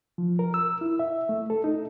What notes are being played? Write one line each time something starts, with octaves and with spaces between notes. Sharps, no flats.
F3
A#4
E6
E4
E5
A3
A4
D#4